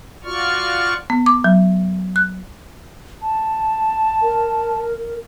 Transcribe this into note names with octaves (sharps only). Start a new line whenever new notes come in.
F4 F#4 D5 C#6 F6
B3
D6
F#3
F#6
A5
A#4